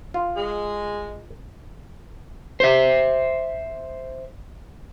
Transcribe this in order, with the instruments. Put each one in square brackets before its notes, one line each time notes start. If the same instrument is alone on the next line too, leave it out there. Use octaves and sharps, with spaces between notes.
[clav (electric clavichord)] F4
[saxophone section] G#3
[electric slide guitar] C5 E5